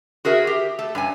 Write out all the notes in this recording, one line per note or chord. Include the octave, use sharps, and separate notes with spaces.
F#4 G#4 A#4 E5
G4
A3 A4
G2 C#4 G#5